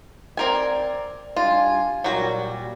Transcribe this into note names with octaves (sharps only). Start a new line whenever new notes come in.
C4 A#4 D5 G#5
G3 D4 F4 G#5
A#2 F#3 G3 F#4